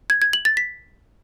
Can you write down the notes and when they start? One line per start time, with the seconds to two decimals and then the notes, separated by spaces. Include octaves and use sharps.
0.10 G#6
0.22 G#6
0.33 F#7
0.45 A6
0.57 B6